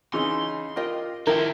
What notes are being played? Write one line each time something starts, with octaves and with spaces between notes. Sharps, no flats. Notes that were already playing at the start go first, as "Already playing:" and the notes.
C#3 E3 D#4 C6
F4 G4 A#4 D#5 G5
D#3 F3 C4 E4 A#4 G5 A5